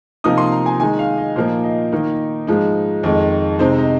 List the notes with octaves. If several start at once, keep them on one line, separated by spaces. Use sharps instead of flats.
C3 F3 A#3 D#4 D#6
C6
A#5
G#5
D#3 G#3 D#4 G#5
F5
D#5
A#2 F3 A#3 D#4 C5
D#5
D#3 A#3 D#4
G#2 F3 G#3 D#4
F2 D#3 G#3 D#5
C3 G#3 C4 D#4 C5
D#5